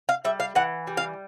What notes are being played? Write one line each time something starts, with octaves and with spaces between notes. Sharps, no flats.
F5
G3 E5
F5
E3 F#5
G3
F5